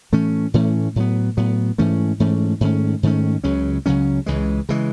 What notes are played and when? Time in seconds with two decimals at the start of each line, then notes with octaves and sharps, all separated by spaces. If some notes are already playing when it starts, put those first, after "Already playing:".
0.12 A2 E3 A3 C#4
0.54 A2 E3 A3 C#4
0.96 A2 F#3 B3
1.37 A2 F#3 B3
1.78 G#2 E3 A3 C#4
2.20 G#2 E3 A3 C#4
2.61 G#2 D#3 A3 C#4
3.03 G#2 D#3 A3 C#4
3.44 C#2 C#3 F#3 C#4
3.86 C#2 C#3 F#3 C#4
4.26 C#2 C#3 E3 G#3
4.69 C#3 E3 G#3